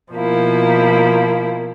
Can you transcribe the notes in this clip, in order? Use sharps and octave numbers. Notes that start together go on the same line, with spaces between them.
B2 F3 A#3 E4